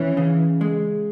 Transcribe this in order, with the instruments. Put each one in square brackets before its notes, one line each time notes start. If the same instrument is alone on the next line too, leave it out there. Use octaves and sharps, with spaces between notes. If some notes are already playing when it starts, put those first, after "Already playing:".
Already playing: [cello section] E3 [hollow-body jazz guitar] C#4
[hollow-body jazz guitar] C#3
G#3